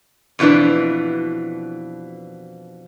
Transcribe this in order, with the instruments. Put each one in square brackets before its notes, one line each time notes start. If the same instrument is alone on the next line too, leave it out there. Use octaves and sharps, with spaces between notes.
[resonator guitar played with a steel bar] F2 B2 E3 D4 B4